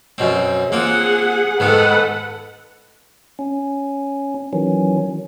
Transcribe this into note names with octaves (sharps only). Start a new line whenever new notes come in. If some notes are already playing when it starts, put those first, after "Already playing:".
F#2 B2 C4
A#3 C4 F4 G#4 F#5
G#2 D#3 B3 A4 B4 F#5
C#4
D#3 E3 F#3 C#4